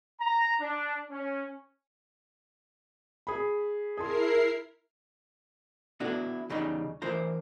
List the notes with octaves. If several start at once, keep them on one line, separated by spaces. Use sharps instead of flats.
A#5
D4
C#4
G#4 B5
E4 G#4 A#4 A5 C6 C7
B3 D4 E4 F#4 A4
E2 C#3 G3 D#4 B5
E3 D4 A#4 C5 A#5